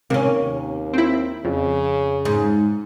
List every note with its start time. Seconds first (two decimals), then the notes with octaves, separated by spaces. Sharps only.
0.10 C3 D#3 A#3 C#4
0.40 D#2
0.93 C4 E4
1.45 F2 C#3
2.25 G#2